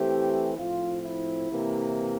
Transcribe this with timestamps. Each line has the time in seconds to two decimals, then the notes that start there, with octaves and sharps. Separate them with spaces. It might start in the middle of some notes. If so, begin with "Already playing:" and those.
Already playing: E3 A3 C4 G4
0.58 A2 F3 C4 F4
1.04 E4
1.50 C3 E3 A#3